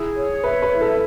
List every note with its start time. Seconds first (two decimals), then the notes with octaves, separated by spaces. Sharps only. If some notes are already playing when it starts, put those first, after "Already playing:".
Already playing: E4 G#4
0.17 C#5
0.44 B4 E5
0.62 B4
0.73 E4
0.81 A4